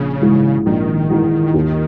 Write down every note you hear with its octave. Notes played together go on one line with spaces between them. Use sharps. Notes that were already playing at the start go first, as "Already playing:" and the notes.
Already playing: A#1 C#3
G#2 E3 G#3
A#1 D#3
G#2 E3 G#3
D#2